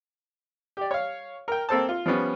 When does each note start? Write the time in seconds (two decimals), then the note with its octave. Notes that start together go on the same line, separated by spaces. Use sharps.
0.77 G4 D5
0.91 C#5 F5
1.48 A#4 G5
1.69 A#3 C4 A4 C5 A5
1.89 F4
2.06 F3 G3 B3 C#4